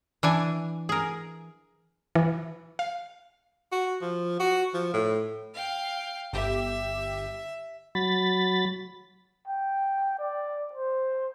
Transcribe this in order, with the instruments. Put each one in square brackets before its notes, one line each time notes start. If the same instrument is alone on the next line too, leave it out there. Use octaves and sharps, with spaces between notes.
[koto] E3 D4 G#5
G#4 A#4
[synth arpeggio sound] E3
F5
[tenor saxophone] F#4
F3
F#4
F3
A2
[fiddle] F5 G5
[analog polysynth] G1 G4 [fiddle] E5
[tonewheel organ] F#3 B5 A6
[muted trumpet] G5
D5
C5